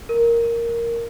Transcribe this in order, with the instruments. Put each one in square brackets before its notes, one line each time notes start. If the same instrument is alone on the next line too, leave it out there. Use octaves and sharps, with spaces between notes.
[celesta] A#4